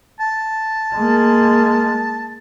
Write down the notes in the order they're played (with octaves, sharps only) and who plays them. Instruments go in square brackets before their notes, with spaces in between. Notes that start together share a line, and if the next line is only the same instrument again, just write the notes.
[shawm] A5
[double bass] G#3 A#3